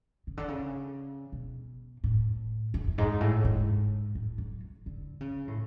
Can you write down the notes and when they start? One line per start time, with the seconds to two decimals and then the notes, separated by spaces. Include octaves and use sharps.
0.27 C#3
0.37 D3
0.48 C#3
1.32 B2
2.04 A2
2.74 F#2
2.87 F#2
2.98 G#2
3.21 A2
3.45 G#2
4.15 A2
4.38 F#3
4.86 D3
5.21 C#3
5.48 A2